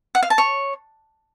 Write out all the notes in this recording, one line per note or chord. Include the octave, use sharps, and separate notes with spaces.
F#5
F5
A5
C#5